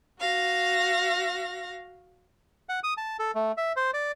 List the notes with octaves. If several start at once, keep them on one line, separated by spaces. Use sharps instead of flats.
F#4 F5 A#6
F#5
D#6
A5
A4
A3
E5
C5
D5